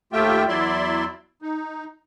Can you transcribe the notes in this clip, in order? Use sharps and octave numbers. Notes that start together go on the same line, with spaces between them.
D#2 A3 F4 G4 E5 G5
E2 F#3 E4 D5 E5 C6
D#4